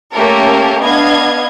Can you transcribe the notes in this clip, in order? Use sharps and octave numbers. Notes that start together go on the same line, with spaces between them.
A3 A#3 C#4 G4 A4 A#4
B3 D4 D#5 F5 G#6